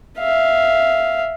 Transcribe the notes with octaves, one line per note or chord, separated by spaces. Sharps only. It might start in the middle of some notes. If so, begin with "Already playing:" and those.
E5 F5